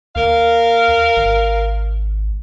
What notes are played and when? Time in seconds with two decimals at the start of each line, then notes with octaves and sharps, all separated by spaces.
0.16 D#2 A#4 F5
1.17 G#1